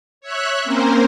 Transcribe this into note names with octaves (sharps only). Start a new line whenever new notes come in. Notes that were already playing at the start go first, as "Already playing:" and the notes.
C#5 E5 F#6
A#3 C4 C#4 A#4 C5